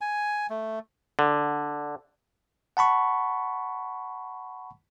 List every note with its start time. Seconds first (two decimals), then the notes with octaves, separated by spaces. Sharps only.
0.01 G#5
0.50 A3
1.19 D3
2.77 F#5 A5 B5 C#6